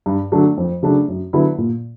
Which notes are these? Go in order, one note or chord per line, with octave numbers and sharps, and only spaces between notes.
G2
D3 F#3 A3 D4
F2
C#3 F#3 A3 D4
F#2
D3 F#3 B3 E4
A#2